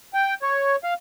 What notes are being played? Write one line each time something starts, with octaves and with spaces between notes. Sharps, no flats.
G5
C#5
F5